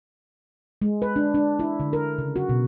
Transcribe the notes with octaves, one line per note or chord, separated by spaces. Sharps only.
G#3
B4
D4
D4
E4
D3
A#4
C#3
F#4
B2